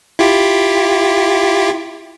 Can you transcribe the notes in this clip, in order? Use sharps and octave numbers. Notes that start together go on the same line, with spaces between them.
E4 F4 G4